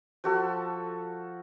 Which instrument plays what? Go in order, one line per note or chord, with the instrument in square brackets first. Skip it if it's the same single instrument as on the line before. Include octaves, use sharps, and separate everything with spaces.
[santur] F3 F#4 A4